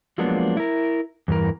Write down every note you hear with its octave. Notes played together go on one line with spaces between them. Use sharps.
F3 F#3 G#3 A#3 B3 D4
E4 A#4
E2 G2 E3 A#4